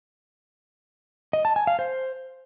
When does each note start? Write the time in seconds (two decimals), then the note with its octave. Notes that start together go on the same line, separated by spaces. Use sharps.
1.33 D#5
1.45 A5
1.56 G#5
1.67 F5
1.79 C5